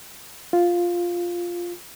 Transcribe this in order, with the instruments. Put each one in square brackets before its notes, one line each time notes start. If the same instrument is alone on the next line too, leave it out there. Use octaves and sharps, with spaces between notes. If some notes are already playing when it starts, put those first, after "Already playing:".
[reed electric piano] F4